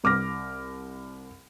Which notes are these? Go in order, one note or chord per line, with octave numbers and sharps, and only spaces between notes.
C2 D6 F6 A#6